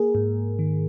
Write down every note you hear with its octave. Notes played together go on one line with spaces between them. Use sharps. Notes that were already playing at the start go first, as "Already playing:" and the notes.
Already playing: A#3 G#4 A#4
G#2
D#3